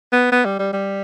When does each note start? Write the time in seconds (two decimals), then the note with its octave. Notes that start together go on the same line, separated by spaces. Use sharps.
0.12 B3
0.32 B3
0.45 G3
0.59 G3
0.73 G3